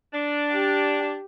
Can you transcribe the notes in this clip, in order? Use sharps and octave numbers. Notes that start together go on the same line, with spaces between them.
D4
G4